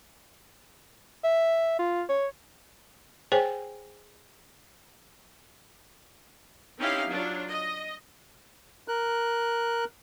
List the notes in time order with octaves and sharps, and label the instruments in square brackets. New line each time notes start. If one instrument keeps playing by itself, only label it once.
[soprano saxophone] E5
F4
C#5
[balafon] G#4 C5 C#5 G5 G#5
[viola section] C4 C#4 D#4 E4 G4 F5
F#3 D4 F4
D#5
[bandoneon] A#4 F#6